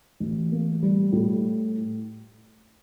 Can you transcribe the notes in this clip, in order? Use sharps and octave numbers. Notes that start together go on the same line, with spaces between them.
A1
A#3
G3
A2